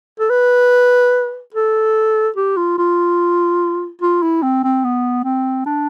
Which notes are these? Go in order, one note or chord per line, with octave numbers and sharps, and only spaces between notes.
A4
B4
A4
G4
F4
F4
F4
E4
C4
C4
B3
C4
D4